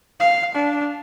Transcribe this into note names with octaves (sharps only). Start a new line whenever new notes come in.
F5
D4